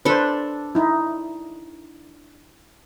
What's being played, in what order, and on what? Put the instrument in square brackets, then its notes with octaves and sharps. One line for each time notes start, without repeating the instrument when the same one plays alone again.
[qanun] D4 A4 [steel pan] B4 C5
[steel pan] D#4 E4